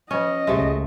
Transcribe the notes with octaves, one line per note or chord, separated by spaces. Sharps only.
F3 C#4 C#5 D#5
C#2 G#3 A3 G4 C5 E5